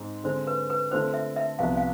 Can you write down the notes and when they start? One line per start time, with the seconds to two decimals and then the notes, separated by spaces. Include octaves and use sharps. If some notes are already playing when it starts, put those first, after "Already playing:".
Already playing: G#2 G#3 C4
0.24 D3 G#3 C4 G#4 C5
0.47 B4
0.70 B4
0.92 D3 A3 C4 F4 C5
1.14 E5
1.36 E5
1.59 C2 C3 F3 B3 F5
1.77 F5